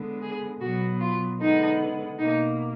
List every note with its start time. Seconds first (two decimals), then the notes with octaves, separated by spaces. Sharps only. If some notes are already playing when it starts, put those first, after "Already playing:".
Already playing: D3 G#3 B3
0.21 G#4
0.60 B2 F#3 B3 F#4
1.00 F4
1.39 D3 G#3 B3 D#4
2.18 B2 A#3 D#4